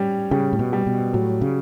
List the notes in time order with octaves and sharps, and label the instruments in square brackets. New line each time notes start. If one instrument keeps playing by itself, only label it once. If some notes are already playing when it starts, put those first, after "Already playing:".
Already playing: [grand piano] G3 C#4
[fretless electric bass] C#3 [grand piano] G3
[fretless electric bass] A2
B2
[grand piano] G3
[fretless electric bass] B2
[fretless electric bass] A2 [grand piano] F#3
[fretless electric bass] C#3